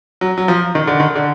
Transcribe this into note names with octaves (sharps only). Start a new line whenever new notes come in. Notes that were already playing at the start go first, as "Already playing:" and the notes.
F#3
F#3
F3
D#3
D3
D#3
D3